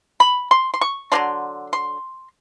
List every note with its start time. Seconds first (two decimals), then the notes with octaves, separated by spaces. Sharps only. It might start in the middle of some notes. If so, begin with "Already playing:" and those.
0.20 B5
0.51 C6
0.74 C6
0.81 C#6
1.12 D3 F#3 A#3 D4 C6
1.73 C6